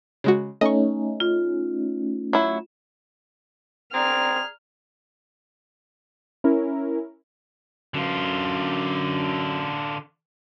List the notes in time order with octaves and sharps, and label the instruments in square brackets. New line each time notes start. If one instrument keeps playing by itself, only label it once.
[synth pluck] C#3 G#3 F#4
[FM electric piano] A3 C#4 D#4 [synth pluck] D#5 C#6
[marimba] F4
[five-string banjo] F#3 E4
[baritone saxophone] C4 [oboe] G#4 [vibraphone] D5 A#5 [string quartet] F6
[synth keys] C#4 E4 A#4
[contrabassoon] F#2 [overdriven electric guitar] D3 F4